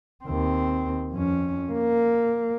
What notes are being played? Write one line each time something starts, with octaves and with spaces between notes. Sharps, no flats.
D#2 C4
F2 C#4
A#3